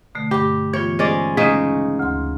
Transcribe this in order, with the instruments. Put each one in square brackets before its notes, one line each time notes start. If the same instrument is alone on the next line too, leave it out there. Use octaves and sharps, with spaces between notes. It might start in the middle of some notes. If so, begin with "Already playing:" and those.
[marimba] B2 D3 A3
[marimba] G2 D6 [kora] G4
[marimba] E3 B3 F4 [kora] C#5
[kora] G#3 C#4 D5 [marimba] C5
[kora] C#3 D#4 G#4 [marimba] G#3 C#4
[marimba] D2 C6